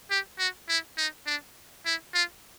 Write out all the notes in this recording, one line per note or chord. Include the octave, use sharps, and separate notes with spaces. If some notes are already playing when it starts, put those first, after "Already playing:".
G4
F#4
E4
D#4
D4
E4
F4